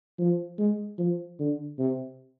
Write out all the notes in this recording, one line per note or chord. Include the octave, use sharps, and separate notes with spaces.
F3
G#3
F3
D3
C3